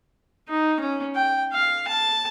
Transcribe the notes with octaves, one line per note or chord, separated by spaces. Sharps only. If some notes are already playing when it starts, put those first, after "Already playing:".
D#4
C#4
G5
F5
A5